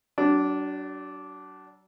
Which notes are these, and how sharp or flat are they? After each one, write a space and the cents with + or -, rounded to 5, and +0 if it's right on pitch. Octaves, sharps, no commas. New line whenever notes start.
F#3 +35 D4 -10